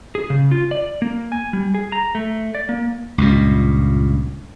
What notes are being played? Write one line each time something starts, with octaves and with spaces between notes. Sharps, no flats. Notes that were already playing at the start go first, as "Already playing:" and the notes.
G#4
C#3
F4
D5
A#3
G#5
G3
G#4
A#5
A3
D5
A#3
C#2 G2 A#2